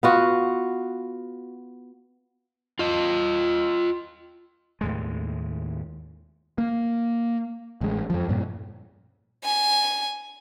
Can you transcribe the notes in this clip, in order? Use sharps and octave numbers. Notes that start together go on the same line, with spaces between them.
B3 F4 F#4
F4 D#5
D#2 A2 G#3
A#3
A1 G#3
F2 F3
G2 A#2
G#5